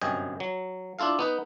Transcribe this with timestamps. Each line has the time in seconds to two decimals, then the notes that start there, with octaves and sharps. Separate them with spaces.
0.01 G1 F#2 C3 D#5 G5 G#5
0.40 F#3
0.99 D4 E4 F4 A4 F5
1.19 B3 D#4 B4